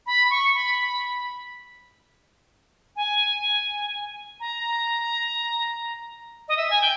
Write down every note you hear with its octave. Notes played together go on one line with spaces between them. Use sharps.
B5
C#6
B5
G#5
A#5
D#5
E5
G#5
G5